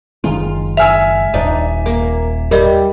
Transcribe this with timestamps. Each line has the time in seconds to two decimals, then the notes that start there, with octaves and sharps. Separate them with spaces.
0.24 F#1 D#3 G#3 F4
0.77 E5 G#5 E6 F6 F7
1.34 D#1 D4 D#4
1.86 A#3
2.51 G3 A#4 D#5